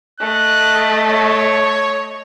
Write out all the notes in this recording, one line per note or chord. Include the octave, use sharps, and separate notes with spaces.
A3 D#5 F#6
C#5